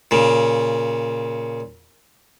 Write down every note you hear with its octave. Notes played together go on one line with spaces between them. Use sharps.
A#2 C#3